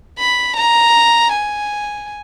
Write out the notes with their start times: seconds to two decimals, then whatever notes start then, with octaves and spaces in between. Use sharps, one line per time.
0.19 B5
0.56 A#5
1.32 G#5